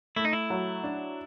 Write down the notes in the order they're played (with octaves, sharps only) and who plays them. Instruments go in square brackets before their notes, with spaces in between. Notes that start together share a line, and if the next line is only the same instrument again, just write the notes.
[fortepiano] A3 [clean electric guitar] E4
[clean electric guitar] D#4
E4
[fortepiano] F#3
D4